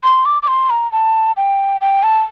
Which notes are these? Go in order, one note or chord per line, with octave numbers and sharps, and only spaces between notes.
C6
D6
D6
C6
A#5
A5
G5
G5
A5